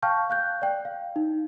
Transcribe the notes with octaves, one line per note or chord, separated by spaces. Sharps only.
F5 G5 A5 C#6 F6 G6
F5 F#6 G6
D5 G5
F5
D#4